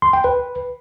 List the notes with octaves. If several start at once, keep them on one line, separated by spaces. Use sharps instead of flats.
C6
G5
B4